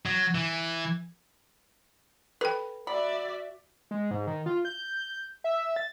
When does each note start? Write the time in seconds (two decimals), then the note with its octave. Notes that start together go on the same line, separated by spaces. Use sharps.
0.06 F#3
0.35 E3
2.41 A4 B4 G5
2.87 F#4 D5 E5 B5
3.91 G#3
4.11 G#2
4.27 D#3
4.46 F4
4.65 G6
5.44 E5
5.76 A6